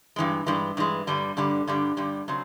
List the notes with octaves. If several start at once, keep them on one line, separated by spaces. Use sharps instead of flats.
G2 E3 G#3
G2 E3 G#3
G2 E3 G#3
G2 D3 G3
G2 D3 G3
G2 D3 G3
G2 D3 G3
C#3 F#3 C4